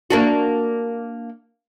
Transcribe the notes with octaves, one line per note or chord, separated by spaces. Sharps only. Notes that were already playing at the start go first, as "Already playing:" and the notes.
A#3 D4 F#4